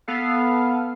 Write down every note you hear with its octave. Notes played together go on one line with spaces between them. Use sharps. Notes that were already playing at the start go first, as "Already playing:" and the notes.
B3 A4 F5